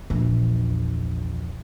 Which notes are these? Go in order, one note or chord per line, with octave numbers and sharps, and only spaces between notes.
A#1 E2